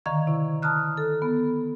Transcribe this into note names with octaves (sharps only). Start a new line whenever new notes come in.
D3 D#3 F5 A#5 C#6 G#6
C3 E4 C#6
A5 A#5 D#6 F6 F#6
A4
B3